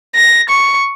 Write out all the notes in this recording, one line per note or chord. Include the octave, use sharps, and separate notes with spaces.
A#6
C#6